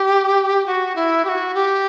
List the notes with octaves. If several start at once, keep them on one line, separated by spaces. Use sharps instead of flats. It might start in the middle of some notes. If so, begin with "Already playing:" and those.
Already playing: G4
F#4
E4
G4
F#4
G4